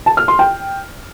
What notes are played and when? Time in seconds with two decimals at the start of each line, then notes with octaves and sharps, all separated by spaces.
0.06 A5
0.17 F6
0.28 C6
0.39 G5